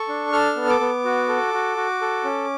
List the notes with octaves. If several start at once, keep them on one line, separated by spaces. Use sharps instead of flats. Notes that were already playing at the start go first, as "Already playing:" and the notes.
Already playing: A4 C#6
D4
A4 F6
B3
D6
B3
F#4
A4
F#4
F#4
A4
C#4